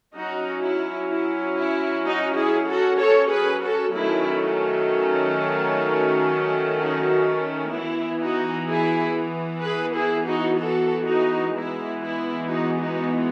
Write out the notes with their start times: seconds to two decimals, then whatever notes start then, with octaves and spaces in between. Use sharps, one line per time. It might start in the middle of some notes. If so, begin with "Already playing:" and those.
0.15 F#3 C#4 D#4 F#4
0.63 E4
1.10 E4
1.58 E4
2.05 D#4 F#4
2.37 E4 G#4
2.69 F#4 A4
3.00 A4 C#5
3.32 G#4 B4
3.63 F#4 A4
3.95 D#3 F#3 A3 C#4 E4
6.80 D#4 F#4
7.74 E3 B3 E4
8.21 D#4 F#4
8.69 E4 G#4
9.64 G#4 B4
9.96 E4 G#4
10.27 D#4 F#4
10.59 F#4 A4
11.07 D#4 F#4
11.54 E3 G#3 B3 E4
12.02 E4
12.49 D#4 F#4
12.80 D#4 F#4